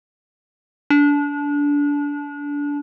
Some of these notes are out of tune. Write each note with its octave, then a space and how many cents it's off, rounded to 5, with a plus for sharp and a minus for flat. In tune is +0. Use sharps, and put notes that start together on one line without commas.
D4 -25